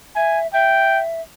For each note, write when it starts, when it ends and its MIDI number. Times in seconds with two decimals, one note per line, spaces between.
0.16 0.47 76
0.16 0.40 80
0.53 1.21 76
0.53 1.02 79